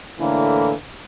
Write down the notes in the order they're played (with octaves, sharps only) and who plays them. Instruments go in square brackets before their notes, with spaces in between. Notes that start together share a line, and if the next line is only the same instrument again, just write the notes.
[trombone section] A2 D3 E3 A#3